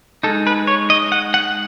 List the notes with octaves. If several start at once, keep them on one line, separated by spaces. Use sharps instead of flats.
G#3 D#4 A4
B4
C#5
D#5
F#5
F#5